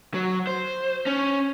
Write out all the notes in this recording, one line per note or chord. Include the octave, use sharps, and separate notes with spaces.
F#3
C5
C#4